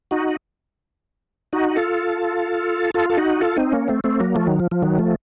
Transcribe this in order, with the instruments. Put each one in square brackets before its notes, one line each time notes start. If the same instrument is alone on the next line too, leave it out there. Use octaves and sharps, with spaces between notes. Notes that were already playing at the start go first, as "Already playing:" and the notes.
[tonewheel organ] D#4 F#4
D#4 F#4
F4 A4
F4 A4
A4
D#4 F#4
F4 A4
C4 D#4
A#3 C#4
A3 C4
A3 C4
F#3 A#3
F3 A3
D#3 F#3
F3
F3
D#3 F#3
F3 A3